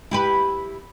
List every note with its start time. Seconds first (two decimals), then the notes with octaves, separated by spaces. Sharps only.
0.11 E4 G4 B4